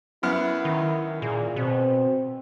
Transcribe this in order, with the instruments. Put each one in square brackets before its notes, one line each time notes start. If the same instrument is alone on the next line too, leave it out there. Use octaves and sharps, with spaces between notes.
[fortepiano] F#2 B3 F6 [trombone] E4
[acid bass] D#3
[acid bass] A#2 [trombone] G#4
[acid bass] B2 [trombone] C4